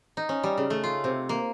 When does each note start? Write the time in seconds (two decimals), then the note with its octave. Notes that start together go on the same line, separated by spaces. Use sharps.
0.17 D#4
0.29 C#4
0.43 G3
0.58 C#3
0.70 A3
0.84 F4
1.04 C3
1.29 A#3